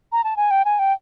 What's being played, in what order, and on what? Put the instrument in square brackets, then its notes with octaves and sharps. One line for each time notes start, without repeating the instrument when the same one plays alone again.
[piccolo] A#5
A5
G#5
G5
G#5
G5